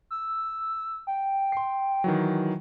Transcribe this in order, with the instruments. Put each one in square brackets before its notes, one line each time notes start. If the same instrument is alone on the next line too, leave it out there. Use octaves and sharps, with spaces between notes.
[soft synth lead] E6
G5
[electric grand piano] C6 C7
D#3 E3 F#3